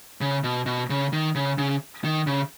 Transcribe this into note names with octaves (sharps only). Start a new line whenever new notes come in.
C#3
B2
B2
C#3
D#3
C#3
C#3
D#3
C#3